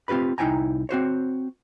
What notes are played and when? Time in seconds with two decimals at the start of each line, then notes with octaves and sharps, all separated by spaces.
0.08 C4 F4 G4 B4 B5
0.38 C2 D#4 E4 G5 G#5 A#5
0.89 C4 F#4 C5 C#5